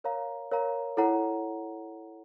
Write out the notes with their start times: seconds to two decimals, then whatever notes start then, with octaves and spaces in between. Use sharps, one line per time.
0.04 A#4 C#5 F5 A#5
0.51 A#4 C#5 F5 A#5
0.97 E4 A4 C#5 F#5 A#5